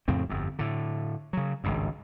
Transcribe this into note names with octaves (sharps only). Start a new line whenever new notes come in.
F2 A2 C#3 C4
G1 F2
A2 D3
C#3 F#3
G#1 C#2 G2